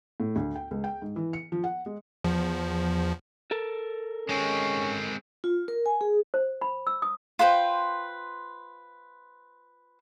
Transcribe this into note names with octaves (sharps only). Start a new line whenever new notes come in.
A2
D2
G5
C#2
G5
G#2
E3
C#7
F3
F#5
G#3
E2 F3
A4 A#4
G#3 C4 C#4
F4
A#4
G#5
G#4
C5
B5
E6
D#6
F4 B4 C5 G5